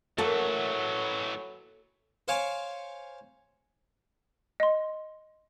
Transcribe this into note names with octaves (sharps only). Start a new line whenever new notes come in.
E3 F#3 A3 A#3 F#4 A4 A5
C5 C#5 F5 G#5 C#6 D6
D#5 C6